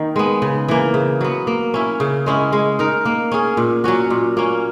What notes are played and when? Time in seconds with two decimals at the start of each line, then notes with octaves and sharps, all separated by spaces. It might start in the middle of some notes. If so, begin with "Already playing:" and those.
Already playing: D#3 A#3 D#4
0.16 G#3 B3
0.42 C#3
0.68 E3 A#3
0.94 C#3
1.21 F#3 B3
1.47 A#3
1.74 C#4 E4
2.00 C#3
2.26 G#3 C#4 E4
2.53 G#3
2.79 D#4 A#4
3.05 A#3
3.32 C#4 G#4
3.57 A#2
3.84 F#3 C#4 F#4
4.10 A#2
4.37 A#3 C#4